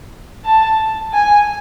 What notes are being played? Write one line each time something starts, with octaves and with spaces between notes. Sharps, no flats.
A5
G#5